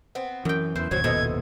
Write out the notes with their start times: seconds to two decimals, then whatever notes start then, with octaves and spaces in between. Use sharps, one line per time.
0.15 B3 C4
0.45 F#2 E3 G5
0.76 E2 E3 E4 C5
0.91 F#1 D#2 A#2 F#3 C4 F#4 G#6
1.04 B2 E4 A4 C5 D#5